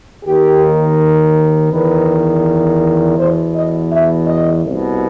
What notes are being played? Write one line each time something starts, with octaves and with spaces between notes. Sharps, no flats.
D#2 D#3 G4
E2 D#3 B4
E2 B2 C5
D#5
E5
D#5
C2
B2